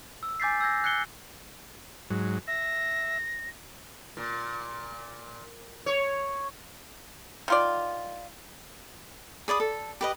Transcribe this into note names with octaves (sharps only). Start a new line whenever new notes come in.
E6
G#5 D6 G6 A6 B6 C7
E6 G6 G#6 A#6
F#6 G#6 C7 C#7 G7
G#2 F#3
E5 A#6
A#2
C#5
D#3 F4 D5
G#4 D5 B5 D#6
A4
G4 B4 D#5